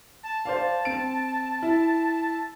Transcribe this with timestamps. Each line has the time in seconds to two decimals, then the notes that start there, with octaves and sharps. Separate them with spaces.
0.23 A5
0.45 C5 D5 F5
0.85 C4 D7
1.62 E4